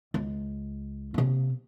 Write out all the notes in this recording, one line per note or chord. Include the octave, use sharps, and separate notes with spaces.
C#2
C3 A#3